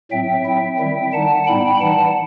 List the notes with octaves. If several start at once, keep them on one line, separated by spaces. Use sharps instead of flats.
A2 F#3 C4 E5 G5
F#3 C4 E4
D#3 G3 C4 E4
D#3 G3 D#4 F#5 A5
A2 G3 B3 D#4 G5 B5
E3 G3 D#4 F#5 A5